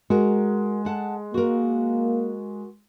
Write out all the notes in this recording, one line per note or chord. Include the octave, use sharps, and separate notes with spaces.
G#3 F#4 A#4
A4 F#5 A5
A#3 F#4 A#4